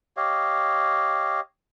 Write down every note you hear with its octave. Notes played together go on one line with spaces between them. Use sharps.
G4 C#5 D#5 F5